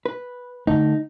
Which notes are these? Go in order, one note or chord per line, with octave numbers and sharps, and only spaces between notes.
B4
D3 A3 D#4